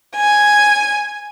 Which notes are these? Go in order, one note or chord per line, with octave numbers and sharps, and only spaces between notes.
G#5